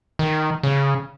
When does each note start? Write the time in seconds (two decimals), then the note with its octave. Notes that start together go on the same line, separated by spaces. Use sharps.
0.19 D#3
0.63 C#3